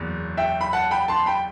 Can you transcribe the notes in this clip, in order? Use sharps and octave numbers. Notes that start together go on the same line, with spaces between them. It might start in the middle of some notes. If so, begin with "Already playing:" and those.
Already playing: F#1 E2
E5 G5
B5
F#5 A5
G5 B5
A5 C6
G5 B5